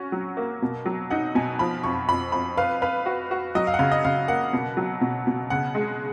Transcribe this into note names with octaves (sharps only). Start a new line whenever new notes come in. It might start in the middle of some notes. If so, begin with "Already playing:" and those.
Already playing: C#4 F#4
F#3
A#3
B2
F#3
D#4 F#5
B2 G#5
F3 B5
F2 C#6
F2 B5
F2 B5
B4 F5
B4 F5
F#4
F#4
F#3 D#5
F5
F#5
C#3 F5
D#5
C#3 F5
A#3 F#5
B2
F#3
B2
B2
C#3 F#5
G#3